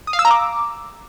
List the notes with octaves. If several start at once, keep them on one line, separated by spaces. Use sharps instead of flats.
D#6
F5
E6
A#5
D6